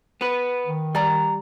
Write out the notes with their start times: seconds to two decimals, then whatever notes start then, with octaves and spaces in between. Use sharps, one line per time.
0.21 B3 B4
0.67 D#3
0.95 G3 D5 A#5